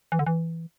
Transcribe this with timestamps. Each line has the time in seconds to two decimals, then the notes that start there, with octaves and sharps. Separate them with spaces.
0.12 E3
0.19 D3
0.27 E3